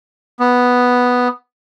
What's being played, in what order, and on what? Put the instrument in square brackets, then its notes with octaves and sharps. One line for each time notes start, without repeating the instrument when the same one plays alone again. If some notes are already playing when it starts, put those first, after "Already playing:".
[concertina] B3